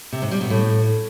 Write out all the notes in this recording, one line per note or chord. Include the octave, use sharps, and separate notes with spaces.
C3
G#2
G3
B2
A2